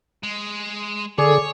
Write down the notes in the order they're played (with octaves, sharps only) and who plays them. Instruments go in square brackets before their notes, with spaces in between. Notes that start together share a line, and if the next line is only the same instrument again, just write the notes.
[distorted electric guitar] G#3
[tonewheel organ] D3 A4 [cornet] G#4 [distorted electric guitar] C#5 [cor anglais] D5